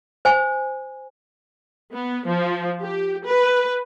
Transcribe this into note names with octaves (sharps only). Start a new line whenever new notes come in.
C5 G#5
B3
F3
G4
B4